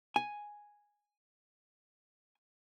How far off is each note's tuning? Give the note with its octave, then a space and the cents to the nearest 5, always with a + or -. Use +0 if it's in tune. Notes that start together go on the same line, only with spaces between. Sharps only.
G#5 +0